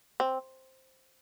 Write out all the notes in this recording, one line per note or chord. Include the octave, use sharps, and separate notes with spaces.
C4